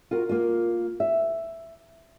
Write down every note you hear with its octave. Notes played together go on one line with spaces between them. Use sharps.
F4 F#4 A#4
A#3 F4
E5